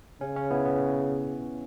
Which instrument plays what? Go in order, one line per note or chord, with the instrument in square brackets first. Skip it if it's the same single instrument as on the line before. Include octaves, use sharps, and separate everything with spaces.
[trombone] C#3 [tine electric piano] C#4
[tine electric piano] C#4
B3 E4
B3